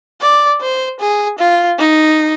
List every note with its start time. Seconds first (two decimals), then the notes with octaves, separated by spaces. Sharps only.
0.21 D5
0.61 C5
1.00 G#4
1.39 F4
1.78 D#4